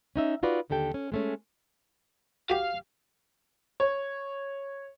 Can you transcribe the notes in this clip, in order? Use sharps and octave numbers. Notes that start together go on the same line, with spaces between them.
C#4 D#4 E5
D#4 F4 F#4 B4 D5
D#2 D3 G4 A4 G5
C#4
G#3 A3 C#4
F#4 G4 F5
C#5